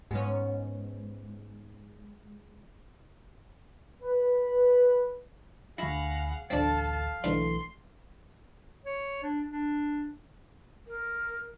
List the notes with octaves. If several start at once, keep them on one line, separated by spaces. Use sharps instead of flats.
G#2 G#3 B3 C#4 G#4
B4
D2 E4 G#4 F5 F#5 B5 A#6
A1 D2 C4 D4 A4 F5 A5 A6
B1 G#2 D3 E3 A3 C6
C#5
D4
D4
A#4